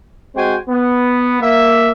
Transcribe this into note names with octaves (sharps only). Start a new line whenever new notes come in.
G#3 C4 F#4 C5 G5 G#5
B3
A#3 E5